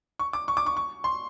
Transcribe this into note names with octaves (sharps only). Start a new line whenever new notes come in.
C#6
D6
C#6
D6
C#6
C#6
C6